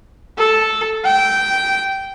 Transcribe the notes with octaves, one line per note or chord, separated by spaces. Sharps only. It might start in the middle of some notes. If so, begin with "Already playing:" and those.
A4
G5